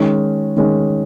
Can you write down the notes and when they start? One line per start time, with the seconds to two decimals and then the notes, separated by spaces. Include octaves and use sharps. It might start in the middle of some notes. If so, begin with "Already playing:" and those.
Already playing: D#3 G#3 C#4
0.57 D#3 G#3 C#4